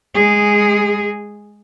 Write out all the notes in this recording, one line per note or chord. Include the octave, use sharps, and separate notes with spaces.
G#3 G#4